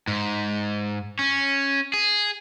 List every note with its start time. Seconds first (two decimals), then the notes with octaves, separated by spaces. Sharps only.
0.07 G#2
1.19 C#4
1.94 G#4